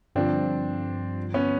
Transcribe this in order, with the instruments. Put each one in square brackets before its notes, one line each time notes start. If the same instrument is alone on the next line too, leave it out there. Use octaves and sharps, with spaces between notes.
[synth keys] G2 D3 F3 [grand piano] C4 D4
[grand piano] B3 C#4